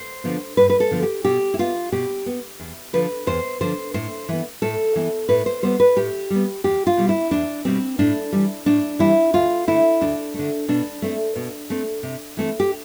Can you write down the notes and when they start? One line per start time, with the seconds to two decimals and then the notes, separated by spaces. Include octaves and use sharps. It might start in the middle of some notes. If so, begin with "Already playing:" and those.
Already playing: C5
0.24 D3 F3 B3
0.57 G2 B4
0.70 B4
0.80 A4
0.91 D3 F3 B3
1.02 G4
1.25 B2 G4
1.54 E4
1.59 B3 F4
1.92 B2 G4
2.26 B3
2.59 E2
2.93 D3 F3 B4
3.27 E2 C5
3.61 D3 F3 C5
3.94 A2 C5
4.29 E3 B3
4.62 A2 A4
4.96 E3 B3
5.29 A2 B4
5.46 C5
5.63 G3 B3 C5
5.80 B4
5.96 A2 G4
6.30 G3 B3
6.64 E2 G4
6.87 F4
6.97 B2 G3
7.09 E4
7.31 E2 D4
7.65 B2 G3 C4
7.99 A2 D4
8.32 E3 G3
8.66 A2 D4
8.99 E3 G3 E4
9.33 D2 F4
9.67 D3 A3 E4
10.01 D2 D4
10.34 D3 A3
10.68 B2 D4
11.02 A3 C4
11.36 B2
11.70 A3 C4
12.03 C3
12.37 E3 A3 C4
12.60 G4